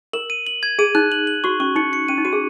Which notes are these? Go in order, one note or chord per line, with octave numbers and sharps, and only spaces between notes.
A#4 F#7
D#7
F#7
G#6
G#4 D#7
D#4 F#6
F#7
F#7
F#4 C#6
C#4 C#6
D#4 C#7
C#7
C#4 D#7
D#4
F#4 D#7
G#4